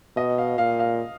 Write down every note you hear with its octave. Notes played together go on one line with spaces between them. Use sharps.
B2 D#5
F5
A#2 F5
F5